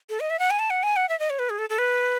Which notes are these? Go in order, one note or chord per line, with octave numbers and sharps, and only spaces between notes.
A4
D#5
E5
F#5
G#5
A5
F#5
G#5
F#5
E5
D#5
C#5
B4
G#4
A4
A4
B4